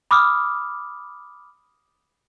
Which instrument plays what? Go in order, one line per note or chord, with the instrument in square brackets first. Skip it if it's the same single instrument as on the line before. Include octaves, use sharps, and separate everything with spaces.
[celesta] B5 D6 D#6 F6